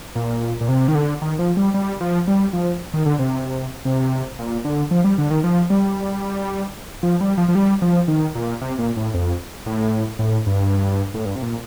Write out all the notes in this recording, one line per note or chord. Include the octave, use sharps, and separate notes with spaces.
A#2
A#2
C3
D#3
D3
D#3
F3
G3
G3
F3
G3
F3
D#3
D3
C3
C3
A#2
D3
F3
G3
D3
D#3
F3
G3
F3
G3
F3
F3
G3
F3
D#3
A#2
C3
A#2
A2
F2
A2
A2
G2
A2
G2
C3
A#2